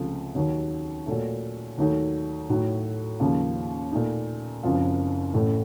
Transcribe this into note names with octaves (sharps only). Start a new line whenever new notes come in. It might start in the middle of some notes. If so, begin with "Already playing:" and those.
Already playing: C#2 C3 F3 A3
D#2 D#3 F#3
A#2 F#3 A3
D#2 D#3 F#3 A3 D#4
A2 F#3 A3 D#4 F#4
D#2 C#3 F3 A#3 F4
A#2 A3 D#4
F#1 F#2 F3 C4 F4
A1 A2 A3